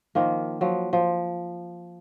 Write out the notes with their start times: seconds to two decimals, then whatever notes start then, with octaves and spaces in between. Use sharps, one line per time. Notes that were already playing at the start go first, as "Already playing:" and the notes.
0.15 D#3 F3 A#3
0.61 F3 F#3
0.93 F3